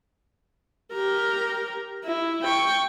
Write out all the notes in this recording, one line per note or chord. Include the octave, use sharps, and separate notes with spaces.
G4 A#4
E4
G5 C#6